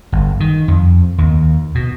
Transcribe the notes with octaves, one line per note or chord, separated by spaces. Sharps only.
G1
D#3
F2
D#2
B2